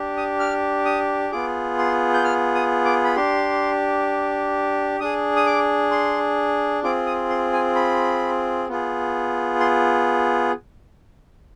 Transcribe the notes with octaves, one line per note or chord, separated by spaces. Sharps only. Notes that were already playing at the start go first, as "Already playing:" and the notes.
Already playing: D4 G4
D#6
F6
D#6
B3 F4 G#4 D6
C6
G6
F6
D#6
D6
B5
D4 G4 C6
D4 G#4 D#6
D#6
D6
C6
C4 F4 G#4 D6
D#6
C6
G#5
B5
B3 F4 G#4
C6